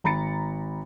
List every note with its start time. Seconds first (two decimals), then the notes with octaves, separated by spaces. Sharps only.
0.04 G#1 A#5 B5 A6 C#7